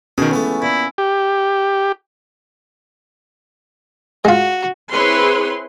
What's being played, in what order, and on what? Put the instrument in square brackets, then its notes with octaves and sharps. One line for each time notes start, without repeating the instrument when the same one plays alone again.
[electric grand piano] B2 D#3 [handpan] C#4 [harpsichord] G#4
[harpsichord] C#2 E3 A3 [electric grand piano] B3
[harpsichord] A#2 [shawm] E4
[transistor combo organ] G4
[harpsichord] G#3 F4 [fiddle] F#4
[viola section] C4 E4 G#4 B4 C#5 C6